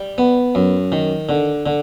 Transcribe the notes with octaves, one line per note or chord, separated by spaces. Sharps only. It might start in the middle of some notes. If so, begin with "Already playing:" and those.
Already playing: G3
B3
F#2
D#3
D3
D3